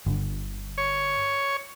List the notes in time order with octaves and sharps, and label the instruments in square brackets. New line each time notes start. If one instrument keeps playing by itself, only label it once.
[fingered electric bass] G1 D3
[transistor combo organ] C#5